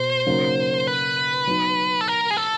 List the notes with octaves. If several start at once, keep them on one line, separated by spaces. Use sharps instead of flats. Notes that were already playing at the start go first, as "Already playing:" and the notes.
Already playing: B2 C5
C#3 F#3 A#3 D#4
B4
F#3 B3 D#4
A4
A#4
G#4
A4